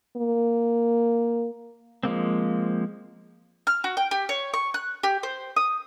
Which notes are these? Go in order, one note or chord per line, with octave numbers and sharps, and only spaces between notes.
A#3
F3 G#3 A#3 C4
F6
F#4
G5
G4
C#5
C#6
F#6
G4
C5
D#6